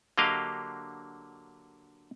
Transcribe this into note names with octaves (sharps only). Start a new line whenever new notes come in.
D3 F#3 A#3 G4 D#5 F5